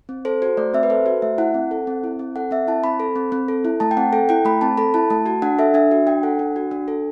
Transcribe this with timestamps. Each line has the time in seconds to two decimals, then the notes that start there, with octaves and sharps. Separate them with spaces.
0.09 C4
0.25 A4 C5
0.42 F#4 C5
0.57 A3 D5
0.74 C4 E5
0.83 B4
0.90 A4 C5
1.06 F#4 C5
1.22 A3 E5
1.38 E4 F#5
1.54 C4
1.71 A4
1.87 C4
2.04 E4
2.19 C4
2.36 A4 F#5
2.51 C4 E5
2.67 E4 A5
2.84 C4 B5
3.00 A4
3.16 C4
3.32 C4
3.48 A4
3.65 E4
3.80 A3 A5
3.91 G5
3.97 C4 F#5
4.13 A4 G5
4.29 E4 G5
4.45 A3 B5
4.61 C4 A5
4.77 A4 B5
4.94 E4 A5
5.10 A3 A5
5.26 F#4 A5
5.42 D4 F#5
5.59 A4 E5
5.74 D4 E5
5.91 F#4
6.07 D4 G5
6.23 A4 F#5
6.39 D4
6.56 F#4
6.71 D4
6.88 A4